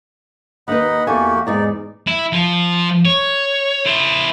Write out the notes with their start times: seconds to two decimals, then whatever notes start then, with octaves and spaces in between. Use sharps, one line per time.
0.68 D#2 D#4 B4 D#5 F#5 B5
1.07 E2 A#3 F#4 G4 A4 G#5
1.47 E2 G#2 G#3 D#4 D5
2.07 E4
2.33 F3
3.05 C#5
3.86 E4 C5